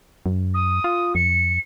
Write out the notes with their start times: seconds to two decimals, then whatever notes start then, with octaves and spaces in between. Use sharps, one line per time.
0.26 F#2
0.54 D#6
0.84 F4
1.15 F2 C#7